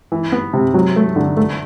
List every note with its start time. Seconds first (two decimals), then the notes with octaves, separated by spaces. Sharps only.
0.12 E3
0.32 B3
0.53 C3
0.74 F#3
0.96 A3
1.16 D3
1.37 A3